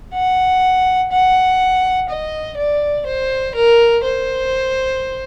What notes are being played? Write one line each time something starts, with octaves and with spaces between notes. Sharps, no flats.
F#5
F#5
D#5
D5
C5
A#4
C5